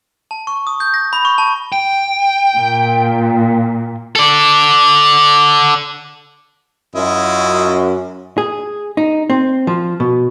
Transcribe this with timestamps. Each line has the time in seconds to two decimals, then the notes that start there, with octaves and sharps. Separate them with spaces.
0.31 A5
0.47 C#6
0.67 D#6
0.80 G6
0.94 A#6
1.13 B5
1.25 C#6
1.38 A5
1.72 G5
2.56 A#2
4.16 A4 D5
6.95 F#2 C#4 E4 F4 D#5
8.38 G#4
8.97 D#4
9.30 C4
9.67 F3
10.00 B2